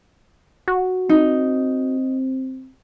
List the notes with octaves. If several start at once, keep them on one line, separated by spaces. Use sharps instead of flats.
F#4
C4 D#4